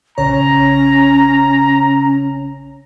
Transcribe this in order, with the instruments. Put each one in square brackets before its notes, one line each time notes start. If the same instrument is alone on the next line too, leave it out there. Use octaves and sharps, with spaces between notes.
[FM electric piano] A#1 C#3 C#5 [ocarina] C#4 [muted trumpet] A#5